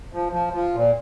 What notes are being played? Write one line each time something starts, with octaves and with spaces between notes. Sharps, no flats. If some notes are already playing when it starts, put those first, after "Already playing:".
F3
F3
F3
A#2